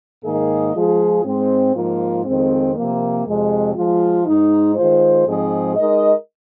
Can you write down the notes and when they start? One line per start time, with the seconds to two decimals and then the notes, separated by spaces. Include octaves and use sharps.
0.23 G#2 D#3 A#3 G#4 D#5
0.74 F3 G#3 F4 G#4
1.24 G#2 G#3 C4
1.74 G#2 F3 A#3 F4
2.24 F2 D#3 G#3 C4
2.75 C3 F3 A#3
3.25 F2 C3 G#3
3.75 F3 G#3 F4
4.25 G#2 G#3 D#4
4.75 D#3 G#3 F4 C5
5.26 G#2 F3 C4 G#4 D#5
5.76 G#3 D#4 A#4 D#5